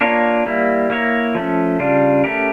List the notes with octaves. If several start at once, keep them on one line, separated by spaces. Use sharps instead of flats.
A#3 D4 F4 A#4 C#5
G3 A#3 E4
A#3 E4 A#4 C#5
F3 A3 C#4
C#3 G3 D4 F4
A3 C#4 G4 A#4